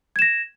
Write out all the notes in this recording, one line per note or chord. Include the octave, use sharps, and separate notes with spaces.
G#6 A#6 E7